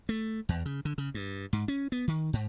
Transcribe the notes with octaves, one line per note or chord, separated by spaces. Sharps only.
A3
E2
C#3
D3
C#3
G2
G#2
C#4
B3
D#3
G#2